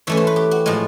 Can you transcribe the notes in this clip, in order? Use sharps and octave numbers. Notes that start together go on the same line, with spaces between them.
E3 A3 C#4 C#5
C5
B4
G4
F#4
A2 F3 G#3 F4